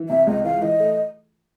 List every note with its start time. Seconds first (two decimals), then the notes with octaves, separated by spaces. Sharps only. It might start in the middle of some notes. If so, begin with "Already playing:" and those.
Already playing: E3
0.09 C3 E5
0.27 C#2 D#5
0.44 E3 F5
0.62 E3 D#5
0.80 A3